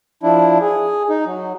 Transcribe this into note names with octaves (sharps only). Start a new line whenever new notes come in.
F3 D4 E4
G#4
D#4
F#3